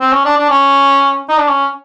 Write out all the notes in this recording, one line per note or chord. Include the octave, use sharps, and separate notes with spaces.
C4
C#4
D4
D4
C#4
D#4
D4
C#4